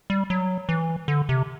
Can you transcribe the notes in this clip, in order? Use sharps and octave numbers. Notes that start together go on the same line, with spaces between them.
G3
F#3
E3
D3
C3